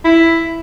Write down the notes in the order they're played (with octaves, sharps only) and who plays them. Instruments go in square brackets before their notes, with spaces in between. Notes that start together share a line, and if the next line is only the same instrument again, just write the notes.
[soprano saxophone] E4